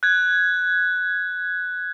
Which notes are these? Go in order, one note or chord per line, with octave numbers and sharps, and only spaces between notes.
F#6 G#6